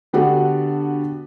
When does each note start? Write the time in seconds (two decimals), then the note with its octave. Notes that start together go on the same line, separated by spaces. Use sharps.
0.13 D3 B3 D4 F#4 G4 A4